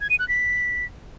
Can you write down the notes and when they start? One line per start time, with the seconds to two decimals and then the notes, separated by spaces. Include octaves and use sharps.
0.01 G#6
0.10 D#7
0.19 F#6
0.28 B6